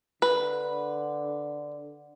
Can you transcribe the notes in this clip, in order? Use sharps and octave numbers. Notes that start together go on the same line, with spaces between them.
D3 B4